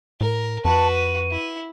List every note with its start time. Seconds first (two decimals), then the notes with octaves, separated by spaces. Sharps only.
0.21 A2 A#4
0.65 F2 F#4 B4 A5
0.95 D#7
1.31 E4